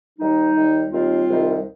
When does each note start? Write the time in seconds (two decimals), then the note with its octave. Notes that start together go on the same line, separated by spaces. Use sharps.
0.19 D#2 D#3 G3 D#4
0.56 D#2 D#3 G3
0.92 D#2 D#3 G3 C4 F4
1.28 C2 C3 D#3 G3